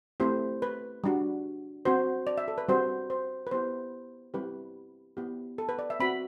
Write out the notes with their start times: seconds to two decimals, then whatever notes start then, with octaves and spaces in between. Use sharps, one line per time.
0.20 A3 C4 E4 G4 C5
0.62 B4
1.04 G3 D4 F#4
1.85 C4 F#4 C5
2.27 D5
2.38 E5
2.48 A4
2.58 B4
2.68 G3 C4 F#4 C5
3.10 C5
3.47 B4
3.51 B3 E4 G4 C5
4.34 G3 C4 E4 G4 B4
5.17 B3 E4 G4
5.58 A4
5.69 B4
5.79 D5
5.90 E5
6.00 C4 F#4 B5